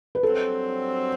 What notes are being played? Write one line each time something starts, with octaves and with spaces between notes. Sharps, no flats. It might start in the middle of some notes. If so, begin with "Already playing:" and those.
B4
G2 F#3 C4 A4